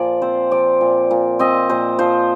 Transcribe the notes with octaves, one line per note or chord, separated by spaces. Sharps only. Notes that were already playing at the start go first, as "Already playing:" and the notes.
Already playing: A#2 F3 D5
C4 C5
F3 D5
A#2
A#2
C4 D#5
A#2 C5
F3 C5